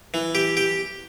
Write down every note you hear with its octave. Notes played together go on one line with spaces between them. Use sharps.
E3
G4
G4